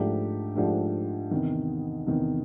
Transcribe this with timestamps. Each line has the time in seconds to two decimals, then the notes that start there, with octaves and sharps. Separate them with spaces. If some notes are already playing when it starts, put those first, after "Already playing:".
Already playing: G#2 F3 A3 D4 G4
0.56 G#2 F3 A3 D4 G4
1.31 E2 C3 D#3
2.07 E2 C3 D#3